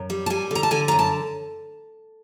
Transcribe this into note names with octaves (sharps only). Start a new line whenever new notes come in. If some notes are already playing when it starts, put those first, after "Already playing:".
Already playing: F#2
G3
A5
G3 G#5
D3 A#5
A5
D3 G#5
F#2 A#5
A5